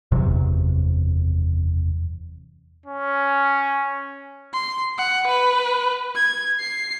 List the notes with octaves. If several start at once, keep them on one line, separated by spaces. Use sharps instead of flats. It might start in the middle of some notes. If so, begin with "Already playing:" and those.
F#1 E2 C3 F#3
C#4
C6
F#5
B4
G#6
C7